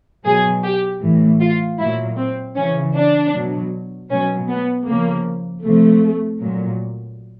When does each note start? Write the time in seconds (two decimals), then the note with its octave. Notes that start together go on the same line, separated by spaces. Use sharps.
0.25 B2 F#3 G#4
0.63 G4
1.02 A2 E3
1.41 F4
1.79 A#2 F#3 E4
2.18 C4
2.56 C#3 E3 C#4
2.95 D4
3.33 B2 F#3
4.11 B2 F#3 C#4
4.49 B3
4.87 C#3 F3 A#3
5.65 C3 F3 A3
6.42 A#2 F#3